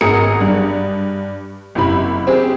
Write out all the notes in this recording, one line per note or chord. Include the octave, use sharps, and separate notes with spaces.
G#1 B3 G#4 A#4 D#6 C#7
G2 D4
F#1 C3 E4 B5
C4 G4 G#4